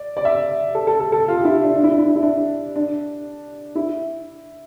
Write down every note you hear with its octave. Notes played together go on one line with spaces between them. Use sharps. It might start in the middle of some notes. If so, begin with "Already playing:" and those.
Already playing: D5
D5
E5
A4
A4
A4
A4
F4
G4
E4
F4
D4
D4
E4
D4
E4
D4
E4
D4
D4
E4